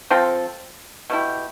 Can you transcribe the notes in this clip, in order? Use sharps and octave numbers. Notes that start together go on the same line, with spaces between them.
F3 C4 F4 A4
B2 A3 E4 G4